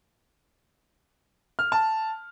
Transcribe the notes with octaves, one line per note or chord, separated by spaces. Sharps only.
F6
A5